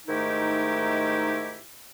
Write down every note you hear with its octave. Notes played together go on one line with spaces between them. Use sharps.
G#2 D#3 A3 D#4 E4 G4